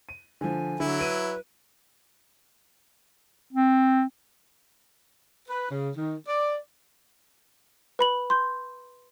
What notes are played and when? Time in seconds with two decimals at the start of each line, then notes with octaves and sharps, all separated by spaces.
0.09 D#7
0.41 D3 F3 G#5
0.80 D3 F#3 E4
0.99 B4 D7 D#7
3.53 C4
5.49 B4
5.70 C#3
5.97 D#3
6.27 D5
7.99 B4 B5 F#7
8.30 C6 G6